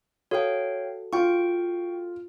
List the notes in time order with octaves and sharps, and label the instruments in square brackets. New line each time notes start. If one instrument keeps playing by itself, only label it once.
[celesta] F#4 A4 [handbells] C#5 F5 G5
[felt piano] F4 [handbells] G5 C#6